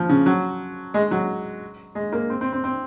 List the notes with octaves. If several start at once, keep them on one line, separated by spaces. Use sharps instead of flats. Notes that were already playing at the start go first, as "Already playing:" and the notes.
Already playing: F3
C#3
F#3
G#3
F#3
G#3
A#3
C4
C4
C4
C4